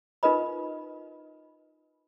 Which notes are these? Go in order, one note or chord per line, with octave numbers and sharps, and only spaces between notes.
D#4 F4 A#4 B4 D#5 B5